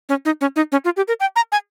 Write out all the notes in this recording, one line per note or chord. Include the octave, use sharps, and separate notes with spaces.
C#4
D#4
C#4
D#4
C#4
F4
G4
A#4
G5
A#5
G#5